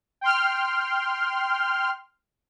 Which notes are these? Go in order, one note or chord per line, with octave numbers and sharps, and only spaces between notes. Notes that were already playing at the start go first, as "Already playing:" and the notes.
G5 C6 F6